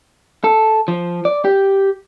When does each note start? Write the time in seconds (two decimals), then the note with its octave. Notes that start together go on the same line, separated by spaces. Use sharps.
0.44 A4
0.88 F3
1.25 D5
1.45 G4